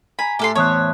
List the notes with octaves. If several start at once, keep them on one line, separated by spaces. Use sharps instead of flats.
G#5 A#5 B5
A2 G4 A4 C6
E2 E3 C5 C#5 A5 D#6 F#6